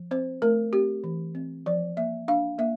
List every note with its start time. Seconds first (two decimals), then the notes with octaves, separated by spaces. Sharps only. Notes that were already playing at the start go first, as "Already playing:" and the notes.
Already playing: F3
0.11 C4 C5
0.42 A3 A#4
0.73 C4 G4
1.04 E3
1.35 C4
1.66 F3 D5
1.97 A#3 E5
2.28 D4 F5
2.59 A#3 E5